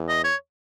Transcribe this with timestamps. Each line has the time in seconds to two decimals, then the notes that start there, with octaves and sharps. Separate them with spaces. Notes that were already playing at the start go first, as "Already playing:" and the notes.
Already playing: E2
0.09 D#5
0.25 C#5